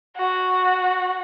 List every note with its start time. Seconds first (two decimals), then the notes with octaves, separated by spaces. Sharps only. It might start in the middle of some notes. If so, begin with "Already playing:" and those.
0.16 F#4